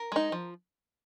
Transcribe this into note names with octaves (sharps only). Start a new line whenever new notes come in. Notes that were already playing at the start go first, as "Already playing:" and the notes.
Already playing: A#4
G#3 D#4
F3